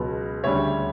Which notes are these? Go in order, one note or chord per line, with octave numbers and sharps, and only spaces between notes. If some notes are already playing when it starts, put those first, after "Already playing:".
Already playing: C#2 B2 F#3
D2 C#3 G3 D4 C#5 E5